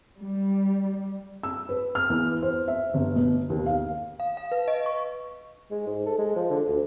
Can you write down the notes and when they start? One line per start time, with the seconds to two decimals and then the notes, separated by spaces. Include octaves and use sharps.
0.19 G3
1.43 E6
1.69 B4
1.95 F6
2.10 E2
2.42 C5
2.68 E5
2.94 G1
3.16 B2
3.50 D#2
3.66 F5
4.20 F5
4.37 F5
4.52 B4
4.68 D#5
4.86 C#6
5.71 G#3
5.87 G#2
6.06 A4
6.18 G#3
6.36 F3
6.50 D3
6.67 D2